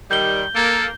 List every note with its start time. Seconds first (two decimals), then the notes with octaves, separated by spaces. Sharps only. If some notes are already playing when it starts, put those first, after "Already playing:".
0.11 D#3 G3 G6 G7
0.55 A#3 A4